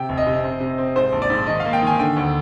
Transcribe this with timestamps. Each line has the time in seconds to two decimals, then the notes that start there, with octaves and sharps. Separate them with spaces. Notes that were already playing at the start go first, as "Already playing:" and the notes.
Already playing: C3 G5
0.09 F1
0.18 D#5
0.26 C3
0.44 C4
0.60 C3
0.78 C4
0.96 G#2 C5
1.12 A#1
1.22 D5
1.30 G#2
1.47 D#3 D#5
1.60 F5
1.65 A#3
1.73 G5
1.82 D#3 G#5
1.99 D3 G5
2.16 D2